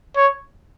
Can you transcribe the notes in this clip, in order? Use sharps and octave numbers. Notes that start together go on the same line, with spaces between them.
C#5